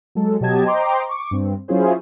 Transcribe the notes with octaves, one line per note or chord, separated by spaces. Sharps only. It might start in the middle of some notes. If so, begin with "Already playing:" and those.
F#3 G#3 A4
B2 F#3 G4 D#5 A5 G#6
C5 D#5 G5 A#5 C6 D6
C#6 D6
G2 C4
F#3 C#4 E4 F4 G#4 C5